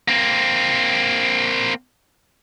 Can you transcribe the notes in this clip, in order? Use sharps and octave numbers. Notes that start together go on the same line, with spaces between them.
A#3 C4